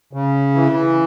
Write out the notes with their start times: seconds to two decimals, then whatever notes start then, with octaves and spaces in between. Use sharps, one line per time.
0.13 C#3
0.55 E3